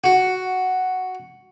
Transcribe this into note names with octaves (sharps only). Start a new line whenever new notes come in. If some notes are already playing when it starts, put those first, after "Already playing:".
F#4